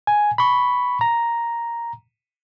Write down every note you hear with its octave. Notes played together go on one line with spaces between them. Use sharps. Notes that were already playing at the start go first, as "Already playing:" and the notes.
G#5
B5 C#6
A#5